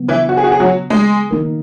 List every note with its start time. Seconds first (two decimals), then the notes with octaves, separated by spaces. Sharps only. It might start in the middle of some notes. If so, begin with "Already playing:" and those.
Already playing: C#3 F#3 B3
0.08 E3 E4
0.29 F#4
0.37 G#4
0.44 F#4
0.52 G#4
0.60 F#3 F#4
0.90 G#3 G#4
1.31 D#3 A#3 D#4 A#4